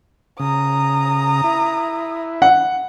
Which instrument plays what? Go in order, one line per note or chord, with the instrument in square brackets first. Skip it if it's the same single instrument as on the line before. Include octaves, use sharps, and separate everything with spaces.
[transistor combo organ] C#3 [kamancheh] A#5 D#6
[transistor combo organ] E4
[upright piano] F#5